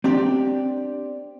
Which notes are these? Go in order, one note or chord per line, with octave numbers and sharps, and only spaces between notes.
C4 D4 G4 D5